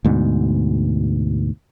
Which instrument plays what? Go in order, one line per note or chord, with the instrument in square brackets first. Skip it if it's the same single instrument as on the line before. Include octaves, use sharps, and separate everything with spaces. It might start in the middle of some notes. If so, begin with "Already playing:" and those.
[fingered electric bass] D2 G#2 B2